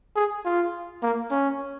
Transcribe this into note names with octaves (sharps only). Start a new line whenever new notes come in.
G#4
F4
A#3
C#4